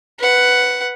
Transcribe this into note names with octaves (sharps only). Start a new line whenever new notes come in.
B4 F#5